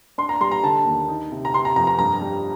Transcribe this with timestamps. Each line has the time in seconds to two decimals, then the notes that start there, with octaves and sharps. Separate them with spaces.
0.18 D4 C6
0.29 A#5
0.40 G3 C6
0.52 A#5
0.63 D3 A5
0.85 D#2
1.08 D#4
1.32 C3
1.45 A#5
1.53 C3 C6
1.65 A#5
1.76 F2 A#5
1.87 A#5
1.99 G2 A#5
2.22 G3